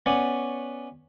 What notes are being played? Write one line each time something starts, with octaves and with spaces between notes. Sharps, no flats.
B3 C#4 C#5 D5 F#5